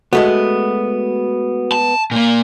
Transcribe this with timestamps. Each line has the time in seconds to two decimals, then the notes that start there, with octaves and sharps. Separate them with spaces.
0.13 G#3 A3 B3 F#4
1.72 A5
2.11 A#2 A#3